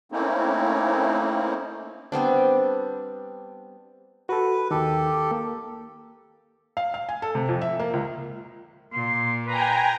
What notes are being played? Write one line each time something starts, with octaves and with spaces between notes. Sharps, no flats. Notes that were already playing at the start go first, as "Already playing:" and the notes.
A3 A#3 C4 C#4 D#4 E4
G3 B3 C4 D4
F#4 A4 B4
D#2 D#3 G4 A4
A#3
F5
F5
G#5
A4
C3
F2
E5
A#3
C#2
A#2 C6
B4 G5 G#5 A#5